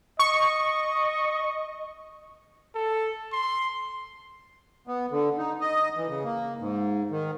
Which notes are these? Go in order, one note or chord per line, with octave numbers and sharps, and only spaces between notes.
D#5 C#6
A4
C6
B3
D3
D#4
D#5
E3
C#3
A#3
G#2
D#3